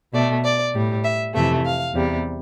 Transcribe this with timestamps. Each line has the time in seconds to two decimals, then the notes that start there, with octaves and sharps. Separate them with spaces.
0.14 B2 A3 D5
0.44 D5
0.74 A2 G3
1.04 E5
1.35 F2 C3 E3 A3 E5
1.66 F5
1.95 E2 C3 G3